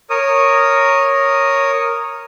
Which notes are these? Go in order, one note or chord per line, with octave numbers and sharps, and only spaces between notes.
A#4 C#5 D#6